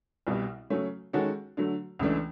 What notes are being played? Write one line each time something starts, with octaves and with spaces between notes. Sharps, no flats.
C2 B2 G3
C#3 F#3 A3 C#4
D#3 G#3 C#4 F#4 A4
D3 F#3 A3
C#2 C#3 E3 A3 D4